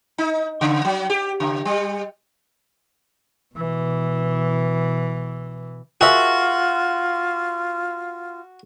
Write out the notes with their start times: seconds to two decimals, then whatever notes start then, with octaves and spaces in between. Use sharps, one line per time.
0.18 D#4
0.61 C#3
0.85 F#3
1.10 G4
1.40 C#3
1.65 G3
3.55 B2 E3
6.01 F4 F#4 G#4 A#4 E5